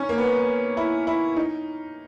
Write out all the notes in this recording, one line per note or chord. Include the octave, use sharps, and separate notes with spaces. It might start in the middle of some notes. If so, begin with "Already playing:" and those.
Already playing: C#4 D#4
A#3
B3
E4
E4
D#4